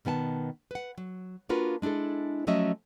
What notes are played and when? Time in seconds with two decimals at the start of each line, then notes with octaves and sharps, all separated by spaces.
0.05 B2 D#3 B3 G#5 A5
0.71 B4 F#5
0.98 F#3
1.49 A#3 D4 F4 F#4 A#4 B4
1.82 G#3 D4 E4 G#4 A4
2.47 F3 F#3 A3 C#4 D#5 E5